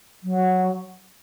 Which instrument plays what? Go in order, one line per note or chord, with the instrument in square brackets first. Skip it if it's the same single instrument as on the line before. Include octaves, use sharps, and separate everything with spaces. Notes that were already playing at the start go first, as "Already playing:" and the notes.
[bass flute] F#3